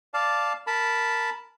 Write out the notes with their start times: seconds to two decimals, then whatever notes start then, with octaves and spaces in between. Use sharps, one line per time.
0.14 D5 F5 A5
0.67 A#4 A5 B5